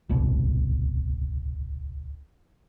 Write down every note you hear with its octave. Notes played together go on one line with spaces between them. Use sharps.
D1 G1 C2 B2